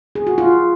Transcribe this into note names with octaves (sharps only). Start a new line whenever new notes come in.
G#4
F#4
F4